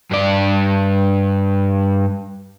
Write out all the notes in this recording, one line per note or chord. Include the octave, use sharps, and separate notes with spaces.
G2 D5